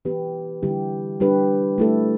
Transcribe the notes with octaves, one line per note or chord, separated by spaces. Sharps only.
E3 B3 G4 B4
D3 G3 E4 G4
G3 D4 G4 B4
A3 E4 A4